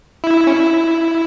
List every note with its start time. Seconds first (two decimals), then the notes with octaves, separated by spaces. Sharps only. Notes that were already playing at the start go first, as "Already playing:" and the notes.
0.24 E4
0.47 C#4
0.53 E4